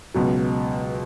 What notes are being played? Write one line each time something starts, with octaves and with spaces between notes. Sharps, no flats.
C#2 B2 F#3